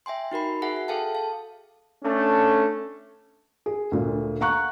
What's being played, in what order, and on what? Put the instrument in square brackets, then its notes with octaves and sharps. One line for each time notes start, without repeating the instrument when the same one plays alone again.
[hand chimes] E5 G5 G#5 C6
D#4 F#4 A#4 B5
F#4 G#4 E5 F#5 G#5
E5
G#4 A4 F5 G5 A5
F5 A5
[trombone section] A3 C#4 D4 A4
[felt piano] G#4
D2 A#2
F5 F#5 A#5 C#6 F#6